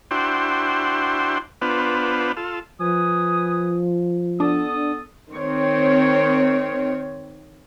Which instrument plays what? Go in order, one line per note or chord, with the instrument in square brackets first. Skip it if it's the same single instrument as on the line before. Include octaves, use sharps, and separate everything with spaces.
[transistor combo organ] D4 E4 F#4 C5 G5 C6
B3 D4 F4 B4 C5
F4 A4
[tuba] F3 [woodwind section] B4 G#5 D#6
[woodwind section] B3 A4 D#6 [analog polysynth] D4
[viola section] D#3 C4 C#5